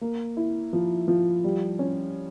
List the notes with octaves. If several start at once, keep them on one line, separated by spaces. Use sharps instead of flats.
A#3
E4
F3
F3
G3
C#4